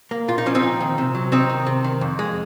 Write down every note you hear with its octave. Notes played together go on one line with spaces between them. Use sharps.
A#3
A#2 F4
D#4
F3 C#4
C4 D#4
A#2
D#3
C3
F#3
C3 C4 D#4
D#3
C3
D#3
F2
G#3